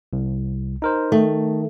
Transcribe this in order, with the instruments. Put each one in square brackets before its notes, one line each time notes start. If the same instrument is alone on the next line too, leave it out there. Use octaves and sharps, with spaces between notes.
[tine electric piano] C2
D#4 A#4 C5
[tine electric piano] D#3 [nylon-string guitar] A3